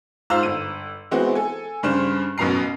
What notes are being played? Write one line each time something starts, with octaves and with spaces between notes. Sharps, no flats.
G#2 F4 C5 F5 A#5 E6
G1 D#7
E3 G#3 B3 C4 F#4
A4 G#5
G2 C#3 D4 C5 F6 E7
A1 F#2 B2 A#5 C7